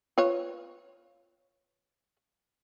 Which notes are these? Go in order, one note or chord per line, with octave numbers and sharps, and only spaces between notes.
F4 B4 C#5